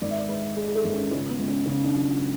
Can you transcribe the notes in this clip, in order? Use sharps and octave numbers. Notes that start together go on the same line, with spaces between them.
G#1 D5
E5
D5
G#3 B4
G#3 G#4
G#4
A4
G#1
C#4
C#2 C#4
B3
C#2
C#4
C#3 C#4
D4
F#3